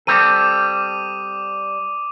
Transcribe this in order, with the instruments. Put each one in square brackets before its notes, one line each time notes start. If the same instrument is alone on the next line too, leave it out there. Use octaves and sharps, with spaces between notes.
[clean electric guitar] G3 C4 A4 [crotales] D6 D#6 D#7